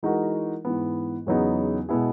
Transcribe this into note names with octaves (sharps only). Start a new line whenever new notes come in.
E3 G#3 D#4 F#4 A#4
G#2 E3 B3
E2 C#3 F#3 B3 D#4
B2 G#3 B3 E4 G#4